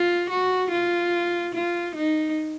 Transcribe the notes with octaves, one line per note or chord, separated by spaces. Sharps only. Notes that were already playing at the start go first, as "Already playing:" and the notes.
Already playing: F4
F#4
F4
F4
D#4